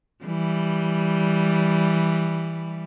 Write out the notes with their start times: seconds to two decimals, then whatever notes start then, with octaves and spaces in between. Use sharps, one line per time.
0.24 E3 G3